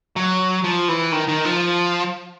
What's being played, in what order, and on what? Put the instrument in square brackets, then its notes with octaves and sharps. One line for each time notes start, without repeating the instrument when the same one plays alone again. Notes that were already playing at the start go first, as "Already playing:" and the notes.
[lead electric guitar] F#3
F3
E3
D#3
D#3
F3